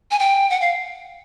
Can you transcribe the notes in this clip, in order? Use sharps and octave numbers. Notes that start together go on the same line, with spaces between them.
G#5
G5
F#5
F5